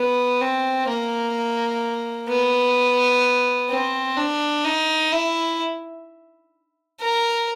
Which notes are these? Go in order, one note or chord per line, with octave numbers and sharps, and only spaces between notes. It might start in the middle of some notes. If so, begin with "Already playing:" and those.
Already playing: B3
C4
A#3
B3
C4
D4
D#4
E4
A#4